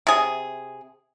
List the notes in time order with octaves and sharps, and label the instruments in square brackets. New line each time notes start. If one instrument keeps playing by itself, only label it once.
[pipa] C3 G#4